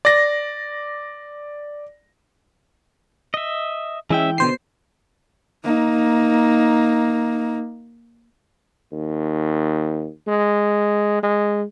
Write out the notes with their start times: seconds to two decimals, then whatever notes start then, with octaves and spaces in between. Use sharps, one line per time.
0.05 D5 A#6
3.34 D#5 E5
4.10 E3 G#3 C#4 E4 E5 G5
4.38 B2 D3 C5 C7
5.64 A#3 D#4
8.92 D#2
10.28 G#3
11.23 G#3